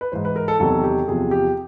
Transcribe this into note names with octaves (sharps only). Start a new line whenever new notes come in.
B4
G#2 E3 C5
B4
A#4
A4
E2 C3 D#3 F#3 A4
G4
E2 C3 F3 G#4
G4